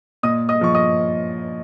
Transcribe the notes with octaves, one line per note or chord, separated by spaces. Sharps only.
A#2 D#5 D#6
D#5 D#6
F3 C#6
D#5 D#6